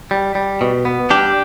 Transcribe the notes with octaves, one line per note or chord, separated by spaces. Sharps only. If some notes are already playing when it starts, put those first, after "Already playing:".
G3
G3
B2
B3
G3 D4 G4